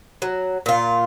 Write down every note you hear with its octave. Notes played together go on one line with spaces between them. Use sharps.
F#3
A#2 F4